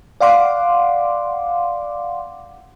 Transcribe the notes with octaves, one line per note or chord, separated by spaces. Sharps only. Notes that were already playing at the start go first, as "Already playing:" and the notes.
D5 F5 F#5 C6 D6